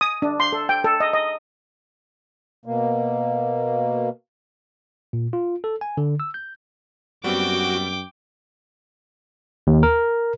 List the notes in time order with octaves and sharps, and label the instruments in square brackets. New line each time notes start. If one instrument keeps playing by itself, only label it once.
[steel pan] D#6
D4
C6
A4
G5
A4
D#5
D#5
[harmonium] B2 A#3
[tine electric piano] A#2
F4
A4
G#5
D3
E6
G6
[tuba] F#2 [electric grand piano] G3 B3 C4 [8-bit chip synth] F#4 [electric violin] G5 D6
[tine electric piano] D#2
A#4